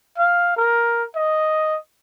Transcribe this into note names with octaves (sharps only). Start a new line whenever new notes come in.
F5
A#4
D#5